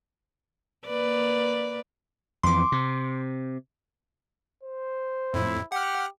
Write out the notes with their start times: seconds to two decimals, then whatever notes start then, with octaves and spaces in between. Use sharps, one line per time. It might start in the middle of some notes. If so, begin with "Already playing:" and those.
0.87 A#3 B4 D5
2.43 F2 E3 C6 D6
2.72 C3
4.63 C5
5.34 F2 A2 E4
5.72 G4 F#5 F6